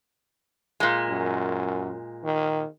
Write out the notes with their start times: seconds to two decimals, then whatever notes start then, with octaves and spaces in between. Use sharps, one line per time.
0.80 A#2 G#3
1.10 F#2
2.24 D#3